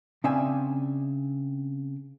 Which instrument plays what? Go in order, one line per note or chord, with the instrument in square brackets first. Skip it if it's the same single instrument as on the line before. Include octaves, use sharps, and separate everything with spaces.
[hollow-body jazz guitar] C#3 C4 D4 E5 G#5